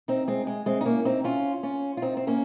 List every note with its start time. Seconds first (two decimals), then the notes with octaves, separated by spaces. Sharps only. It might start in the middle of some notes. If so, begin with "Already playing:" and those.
0.08 C4 D#4
0.28 G#3 C4
0.47 G#3
0.66 G#3 C4
0.81 D#4
0.86 A#3 C#4
1.05 C4 D#4
1.24 C#4 F4
1.63 C#4 F4
1.97 F4
2.02 C4 D#4
2.17 C4
2.27 A#3 C#4